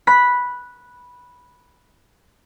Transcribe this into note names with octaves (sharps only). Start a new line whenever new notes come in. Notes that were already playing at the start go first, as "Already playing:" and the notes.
B5 F#6 B6